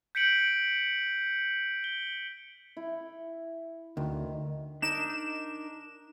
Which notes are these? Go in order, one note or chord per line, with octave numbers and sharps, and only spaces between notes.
G6 B6 C#7 D7 F#7
G7
E4
D2 D#3
D4 D#4 A#4 E7